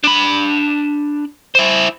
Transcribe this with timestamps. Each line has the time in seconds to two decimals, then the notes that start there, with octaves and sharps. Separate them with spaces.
0.04 D4 B5
1.55 E4 C5